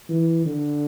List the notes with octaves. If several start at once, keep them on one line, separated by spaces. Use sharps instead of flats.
E3
D3